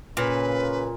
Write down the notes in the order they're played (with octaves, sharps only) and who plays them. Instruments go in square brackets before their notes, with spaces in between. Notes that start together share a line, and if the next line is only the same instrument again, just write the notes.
[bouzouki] A#2 [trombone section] C#3 C#4 [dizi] B4